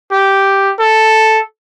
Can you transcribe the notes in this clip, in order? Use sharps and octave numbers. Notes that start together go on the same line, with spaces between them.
G4
A4